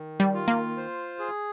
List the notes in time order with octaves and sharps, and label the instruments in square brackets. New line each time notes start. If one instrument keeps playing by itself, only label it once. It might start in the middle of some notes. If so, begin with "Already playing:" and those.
Already playing: [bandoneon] D#3
[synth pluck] G3
[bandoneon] F4
[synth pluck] A#3
[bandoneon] C5
G#4